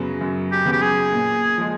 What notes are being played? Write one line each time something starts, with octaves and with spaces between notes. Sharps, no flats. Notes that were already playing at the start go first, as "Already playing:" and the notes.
Already playing: F#2 C#3 F#3 B3
F#2
G4
C#3 F#3 B3
G4
G#4
A#2
F3 G#3